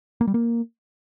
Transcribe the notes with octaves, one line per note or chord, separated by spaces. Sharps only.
A#3
G3
A#3